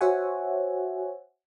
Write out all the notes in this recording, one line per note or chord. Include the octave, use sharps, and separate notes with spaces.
F#4 C5 C#5 E5 F#5 G#5